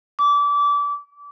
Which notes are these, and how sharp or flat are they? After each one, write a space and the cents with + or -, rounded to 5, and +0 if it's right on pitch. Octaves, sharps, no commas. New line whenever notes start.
D6 -25